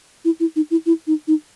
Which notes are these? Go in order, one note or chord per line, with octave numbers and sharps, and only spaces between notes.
E4
E4
D#4
E4
E4
D#4
D#4